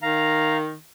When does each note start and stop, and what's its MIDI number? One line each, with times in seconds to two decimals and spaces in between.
0.02 0.76 51
0.02 0.57 77
0.02 0.57 82